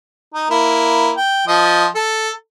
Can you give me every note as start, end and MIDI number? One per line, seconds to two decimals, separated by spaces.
0.34 0.47 63
0.50 1.12 58
0.50 1.12 64
1.17 1.43 79
1.47 1.85 53
1.47 1.85 75
1.95 2.30 69